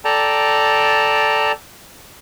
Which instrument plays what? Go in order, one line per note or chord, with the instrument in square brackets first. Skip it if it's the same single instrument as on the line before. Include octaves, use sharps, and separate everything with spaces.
[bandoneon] A4 D5 G5 A5 A#5